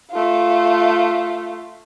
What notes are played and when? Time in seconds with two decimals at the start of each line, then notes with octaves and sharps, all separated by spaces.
0.11 A3 F4